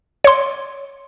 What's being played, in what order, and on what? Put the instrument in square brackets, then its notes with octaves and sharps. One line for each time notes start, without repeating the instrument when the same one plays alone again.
[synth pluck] C#5 C6